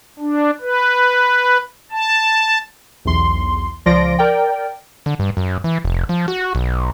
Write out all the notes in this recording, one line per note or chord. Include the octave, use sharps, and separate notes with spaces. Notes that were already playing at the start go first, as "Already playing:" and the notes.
D4
B4
A5
B1 E2 C6
C#2 F3 D5 C6 A#6 D7
A#4 D5 G5
D3
G2
F#2
E3
F1
F3
F#4
B1